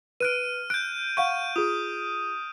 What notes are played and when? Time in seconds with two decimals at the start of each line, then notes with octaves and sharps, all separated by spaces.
0.20 B4 F6 F#6 D7 D#7
0.70 F#6 G6 D7
1.17 F5 F#5 C#6 G6 D#7
1.56 F4 G#4 D#6